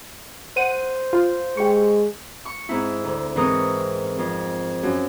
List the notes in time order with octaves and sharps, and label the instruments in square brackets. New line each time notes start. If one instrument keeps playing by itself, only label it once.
[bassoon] C5 [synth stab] F#5 D#7
[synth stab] F4
[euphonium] G#3 [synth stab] G4 C#6
[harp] C#6
G#2 C4 E4
D2
G#2 E3 C4 A#4 C#6 D#6
F2
F#2